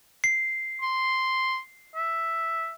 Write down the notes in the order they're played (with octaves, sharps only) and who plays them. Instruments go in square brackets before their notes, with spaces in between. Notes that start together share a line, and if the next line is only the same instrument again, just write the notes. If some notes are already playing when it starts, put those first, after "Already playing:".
[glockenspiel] C7
[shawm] C6
E5